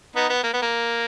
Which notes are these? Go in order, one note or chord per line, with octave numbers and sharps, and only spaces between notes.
B3 D#4
B3
A#3
B3
A#3